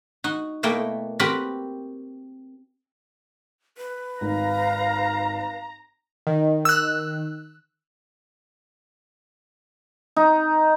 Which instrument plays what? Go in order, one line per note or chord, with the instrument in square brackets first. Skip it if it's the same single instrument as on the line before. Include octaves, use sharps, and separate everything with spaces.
[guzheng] D#4 F#4
B2 A3 A#3 E4 G5
C4 F#4 G4 A#4 B4 B5
[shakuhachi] B4
[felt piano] G#1 [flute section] F5 [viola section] A#5
[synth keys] D#3
[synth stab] E6 F#6
[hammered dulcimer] D#4